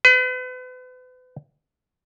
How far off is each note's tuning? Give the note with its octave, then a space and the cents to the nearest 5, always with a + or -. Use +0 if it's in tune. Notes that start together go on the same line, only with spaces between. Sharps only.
B4 +40